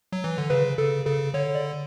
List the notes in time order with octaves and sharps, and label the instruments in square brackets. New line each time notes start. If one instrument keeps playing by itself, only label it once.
[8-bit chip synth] F#3
E3
D3
[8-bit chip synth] C#3 [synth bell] B4
[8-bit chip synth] C#3 [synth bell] A4
[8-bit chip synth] C#3 [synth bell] A4
[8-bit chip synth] D3 [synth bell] C#5
[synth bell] D5